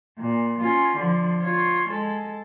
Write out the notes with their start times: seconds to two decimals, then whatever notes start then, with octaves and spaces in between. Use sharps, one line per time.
0.18 A#2
0.60 C#4 F4
0.96 D3 F3
1.42 F4 C#5
1.88 G#3 A4